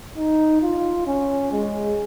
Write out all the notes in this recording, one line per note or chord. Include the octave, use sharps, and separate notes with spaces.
D#4
F4
C#4
G#3